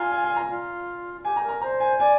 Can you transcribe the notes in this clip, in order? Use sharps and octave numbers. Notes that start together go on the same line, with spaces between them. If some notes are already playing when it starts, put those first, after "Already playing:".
Already playing: F4 G#5 A#5
G#5
G#5
A#5
F4
G4 G#5
A#5
A#4
A#5
C5 A#5
G#5
D5 G#5